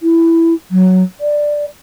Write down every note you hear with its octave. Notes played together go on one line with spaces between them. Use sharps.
E4
F#3
D5